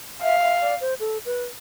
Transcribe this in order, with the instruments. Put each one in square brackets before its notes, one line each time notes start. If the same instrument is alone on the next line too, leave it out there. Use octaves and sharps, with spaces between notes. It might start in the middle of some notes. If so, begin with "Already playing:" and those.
[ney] E5 [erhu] F5
[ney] E5
D5
C5
A4
B4